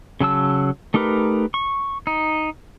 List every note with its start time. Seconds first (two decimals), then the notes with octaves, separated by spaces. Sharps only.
0.20 C#3 F#3 A5 E6
0.94 A3 D#4 G4 A#4 B4
1.54 C#6
2.07 D#4